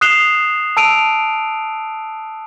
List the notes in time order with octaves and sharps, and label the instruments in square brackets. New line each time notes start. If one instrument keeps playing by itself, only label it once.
[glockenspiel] D#6 F#6 C7 E7 F7 G7
A5 E6 D7 D#7 F7